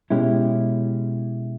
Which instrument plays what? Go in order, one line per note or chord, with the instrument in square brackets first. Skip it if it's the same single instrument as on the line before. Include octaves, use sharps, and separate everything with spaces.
[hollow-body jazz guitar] B2 G#3 C#4 E4 G4